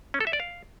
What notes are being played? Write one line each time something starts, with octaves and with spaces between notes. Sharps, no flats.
C#4
A4
E5
D5
F5